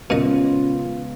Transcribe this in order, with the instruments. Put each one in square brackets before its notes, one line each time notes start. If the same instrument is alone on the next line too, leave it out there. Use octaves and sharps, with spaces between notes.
[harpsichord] A#2 D#5 [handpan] C#3 G#3 B3 [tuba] C#4 [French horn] F4